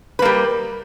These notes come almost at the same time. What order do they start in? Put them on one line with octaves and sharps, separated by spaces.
B4 A#3 G3